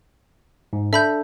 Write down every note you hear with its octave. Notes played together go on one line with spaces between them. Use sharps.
G#2
D4 A4 E5 B5 G6